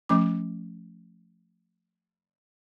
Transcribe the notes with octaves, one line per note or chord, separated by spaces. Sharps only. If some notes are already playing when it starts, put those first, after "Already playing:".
F3 A3 C#4 D6